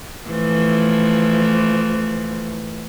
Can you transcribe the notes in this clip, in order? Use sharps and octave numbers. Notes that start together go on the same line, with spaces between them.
E3 F3 A3